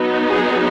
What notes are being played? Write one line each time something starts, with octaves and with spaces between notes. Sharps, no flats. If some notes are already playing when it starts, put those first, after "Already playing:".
Already playing: F#3 B3 D#4
G#4